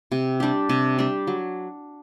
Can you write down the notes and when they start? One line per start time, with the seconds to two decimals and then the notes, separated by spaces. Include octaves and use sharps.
0.12 C3
0.40 G3 D4 G4
0.69 C3
0.98 G3 D4 G4
1.27 F#3